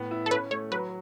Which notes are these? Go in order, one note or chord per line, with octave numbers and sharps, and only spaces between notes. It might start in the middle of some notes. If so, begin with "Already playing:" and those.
Already playing: A2 B3
E4
A4
C#4 B4
A3 C#5
F#3 B4